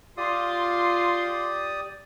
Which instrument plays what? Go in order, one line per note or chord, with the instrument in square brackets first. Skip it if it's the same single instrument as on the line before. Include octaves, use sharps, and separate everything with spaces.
[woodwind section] F4 C6 [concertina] G4 D5 D#6